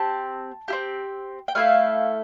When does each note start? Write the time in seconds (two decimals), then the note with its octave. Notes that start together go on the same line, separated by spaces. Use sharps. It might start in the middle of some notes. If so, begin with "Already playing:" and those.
Already playing: C4 G4 A5
0.68 C4 E4 G4
1.48 G5
1.55 A3 E4 A4 F5